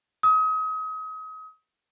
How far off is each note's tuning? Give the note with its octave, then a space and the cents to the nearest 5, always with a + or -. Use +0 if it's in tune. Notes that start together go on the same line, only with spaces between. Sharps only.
D#6 +35